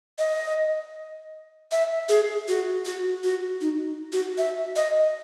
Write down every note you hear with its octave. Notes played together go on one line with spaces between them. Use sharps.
D#5
E5
G#4
F#4
F#4
F#4
D#4
F#4
E5
D#5